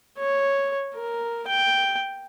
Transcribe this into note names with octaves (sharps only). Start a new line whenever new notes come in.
C#5
A#4
G5